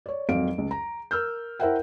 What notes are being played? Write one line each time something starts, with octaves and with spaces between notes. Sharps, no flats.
C#5 D5
G#1 F2 F#3 F5 D7
C#2
A#5
A#4 E6 F6 G6
E4 A#4 C5 E5 F#5 G5